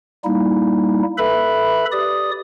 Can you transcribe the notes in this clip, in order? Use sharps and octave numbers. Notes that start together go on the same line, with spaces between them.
G3 A#3 D#4 E4
A4 B4 E5 B5
G4 D5 D#6